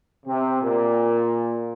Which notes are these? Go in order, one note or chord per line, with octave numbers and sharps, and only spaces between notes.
C3
A#2